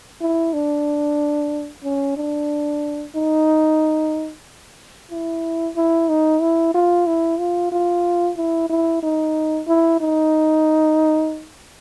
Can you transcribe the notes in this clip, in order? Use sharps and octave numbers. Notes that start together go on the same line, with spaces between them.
E4
D4
C#4
D4
D#4
E4
E4
D#4
E4
F4
E4
F4
F4
E4
E4
D#4
E4
D#4